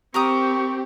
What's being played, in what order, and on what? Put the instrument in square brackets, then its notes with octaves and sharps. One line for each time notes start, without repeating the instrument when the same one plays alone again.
[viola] C4 [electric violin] G4 [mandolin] A#4 A#5 D#6 [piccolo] C#6